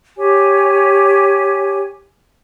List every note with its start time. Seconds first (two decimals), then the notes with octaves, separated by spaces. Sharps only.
0.16 G4 C#5 G#5